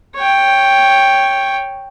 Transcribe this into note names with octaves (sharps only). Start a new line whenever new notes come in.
C#5 G5